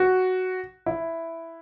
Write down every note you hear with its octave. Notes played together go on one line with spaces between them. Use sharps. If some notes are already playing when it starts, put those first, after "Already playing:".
Already playing: F#4
E4